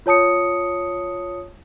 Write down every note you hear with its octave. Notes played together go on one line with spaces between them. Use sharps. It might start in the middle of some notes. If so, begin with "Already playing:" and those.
F4 C#5 A5 D#6 C#7